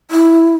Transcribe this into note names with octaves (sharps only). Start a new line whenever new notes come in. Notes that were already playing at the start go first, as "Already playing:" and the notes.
E4